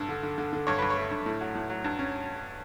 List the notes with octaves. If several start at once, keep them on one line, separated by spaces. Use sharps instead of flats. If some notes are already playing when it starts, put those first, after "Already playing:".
Already playing: G2 A4
D3
D3
D3
D3
G2 C#5
G2 B4
C#5
A3
G2
A2
F#3
A2
F#3
G2
C#4